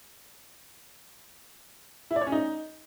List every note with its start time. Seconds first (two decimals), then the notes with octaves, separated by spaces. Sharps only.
2.11 E4
2.16 D5
2.21 C#5
2.27 C#4
2.32 D#4